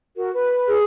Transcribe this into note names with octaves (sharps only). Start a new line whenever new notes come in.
F#4 A#4
B4
G#4